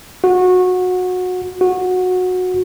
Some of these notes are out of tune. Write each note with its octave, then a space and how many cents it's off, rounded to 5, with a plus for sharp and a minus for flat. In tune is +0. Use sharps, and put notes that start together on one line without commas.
F#4 -20
F#4 -15